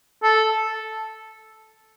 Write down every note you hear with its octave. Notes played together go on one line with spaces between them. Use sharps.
A4